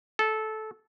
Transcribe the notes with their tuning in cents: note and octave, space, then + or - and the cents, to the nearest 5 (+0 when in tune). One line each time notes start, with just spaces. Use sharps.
A4 -15